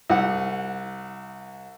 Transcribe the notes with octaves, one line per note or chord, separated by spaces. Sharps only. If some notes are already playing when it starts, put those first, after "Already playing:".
C2 F#5